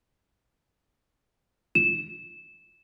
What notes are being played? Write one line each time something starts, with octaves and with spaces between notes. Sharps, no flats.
E7